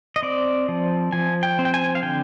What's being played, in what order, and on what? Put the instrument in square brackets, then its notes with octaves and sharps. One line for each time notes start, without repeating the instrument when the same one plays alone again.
[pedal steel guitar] D#5
C4 D5
F3
F3 G#5
G5
C4
G5
G#5
F5
D3 G5